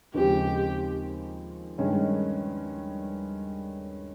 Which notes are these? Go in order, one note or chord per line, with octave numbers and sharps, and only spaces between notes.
D#2 C#3 F3 G#3 C4 G4
G2 D#3 G#3 C#4